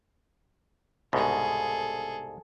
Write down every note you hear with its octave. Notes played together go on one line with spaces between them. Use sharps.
C2 G#2 B2 G#4 A4